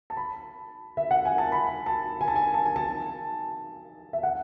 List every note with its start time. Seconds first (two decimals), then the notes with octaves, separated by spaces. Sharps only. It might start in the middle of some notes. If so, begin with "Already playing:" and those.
0.10 A5
0.17 B5
0.97 E5
1.11 F#5
1.25 G#5
1.38 A5
1.52 B5
1.86 A5
2.21 G#5
2.28 A5
2.36 G#5
2.54 A5
2.66 G#5
2.76 A5
4.13 E5
4.23 F#5